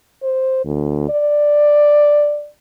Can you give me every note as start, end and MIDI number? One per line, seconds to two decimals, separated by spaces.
0.23 0.65 72
0.65 1.05 38
1.09 2.48 74